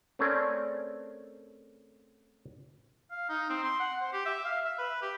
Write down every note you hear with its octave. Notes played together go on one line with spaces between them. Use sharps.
A3 C4 C#4 G#4 A#4 D5
F5
D#4
C4
C6
F#5
C5
G4
E5
F5
E5
B4
G4